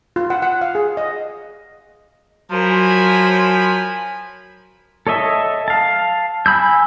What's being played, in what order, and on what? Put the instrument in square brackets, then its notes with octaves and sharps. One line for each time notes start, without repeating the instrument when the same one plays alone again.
[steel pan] F4
F#5
F#5
F5
G#4
D#5
[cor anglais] F3 [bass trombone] F#3 [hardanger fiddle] A#4 [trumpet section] G#5 B5
[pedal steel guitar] A4 C#5 D#5 E5
F5 A5
G#5 A#5 B5 E6 G6